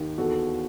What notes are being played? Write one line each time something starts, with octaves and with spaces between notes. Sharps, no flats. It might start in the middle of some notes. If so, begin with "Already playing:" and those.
Already playing: D#2 D#3
E2 F#4 A4